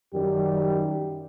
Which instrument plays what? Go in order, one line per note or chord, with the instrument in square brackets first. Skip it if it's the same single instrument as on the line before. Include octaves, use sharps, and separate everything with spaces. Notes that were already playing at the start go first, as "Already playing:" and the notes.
[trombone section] F#2 D#3 G3 G4